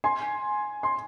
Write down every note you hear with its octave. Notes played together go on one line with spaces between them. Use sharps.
G#5 C6
C6